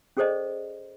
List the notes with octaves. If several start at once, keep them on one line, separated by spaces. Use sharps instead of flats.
C#4 G#4 A4 C5 D5 D#5